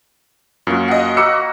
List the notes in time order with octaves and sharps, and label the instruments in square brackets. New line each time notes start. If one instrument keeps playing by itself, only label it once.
[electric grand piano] F#2 A#3 [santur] F4 F#4
[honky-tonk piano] D#5 F5 F#5
[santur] A#3 F#4 [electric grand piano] B5 E6 C#7